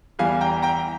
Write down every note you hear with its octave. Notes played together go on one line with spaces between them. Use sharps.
E2 E3 G3 F5 G#5
G5 A#5
G5 A#5